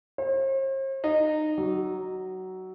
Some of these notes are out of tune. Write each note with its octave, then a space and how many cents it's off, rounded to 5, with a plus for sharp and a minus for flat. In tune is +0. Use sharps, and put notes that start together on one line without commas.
C5 +45
D#4 -20
F#3 +15